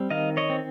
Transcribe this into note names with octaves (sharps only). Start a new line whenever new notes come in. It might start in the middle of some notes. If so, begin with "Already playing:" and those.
Already playing: G3 C4
D#3 D#5 F5
C#5 D#5
C4